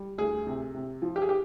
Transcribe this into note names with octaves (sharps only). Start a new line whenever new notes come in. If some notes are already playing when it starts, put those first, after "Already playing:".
Already playing: G3
D2 G#4
C3
C3
F3
G4
G#4
G4